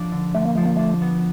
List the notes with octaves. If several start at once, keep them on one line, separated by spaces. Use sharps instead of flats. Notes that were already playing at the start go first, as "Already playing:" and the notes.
Already playing: F3 D4
D3
D3 A3
A#3
F3 A3
A#3
A3 D4
B3